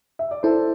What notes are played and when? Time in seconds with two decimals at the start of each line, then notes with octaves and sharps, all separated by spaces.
0.19 E5
0.31 D5
0.43 E4 A4 C5